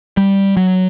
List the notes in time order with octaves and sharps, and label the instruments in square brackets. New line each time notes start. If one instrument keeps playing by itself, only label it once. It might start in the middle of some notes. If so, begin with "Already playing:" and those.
[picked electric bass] G3
F#3